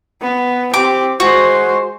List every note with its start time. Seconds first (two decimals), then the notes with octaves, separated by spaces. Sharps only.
0.22 B3
0.74 C4 G4 D6
1.20 G#3 F#4 C5